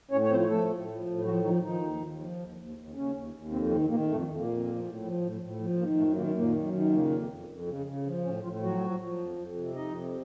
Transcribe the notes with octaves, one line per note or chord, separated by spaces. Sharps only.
A2 C#4 C#5
C#5
F3 C4 C5
F3 A3 A4
A2
F3
A2
F3 F#3 F#4
D#3 F3 D#4
D#3 F3 D#4
D#2
D#2
F3
D#2
D#2
D#2
D#2 C#3 C#4
D#2
D#2
F2 C3 C4
C3 D#3 C4
A#2 D#3 A#3
F2 A2 A3
F2
A#2 A#3
F2
F3
A2
F3
A2
A2
F3
A#2 D#3 A#3
F#2 A2 A3
A#2 D#3 A#3
A#2 D#3 A#3
F#2
D#3
A#2 C#3 A#3
F2
F2
F2
C#3
C#3
F3
A2 C#3 C#4
A2 F3 F4
F3 F#3 F#4
F3
F3
F2
F2
C3
F2 D#4 D#5
C3